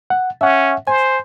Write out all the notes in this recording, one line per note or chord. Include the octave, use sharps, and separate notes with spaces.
F#5
C#4 E5 F#5
C5 G#5